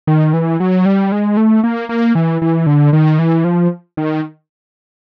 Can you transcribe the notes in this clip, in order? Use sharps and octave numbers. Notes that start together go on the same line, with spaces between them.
D#3
E3
F#3
G3
G#3
A3
A#3
A#3
E3
E3
D3
D#3
E3
F3
D#3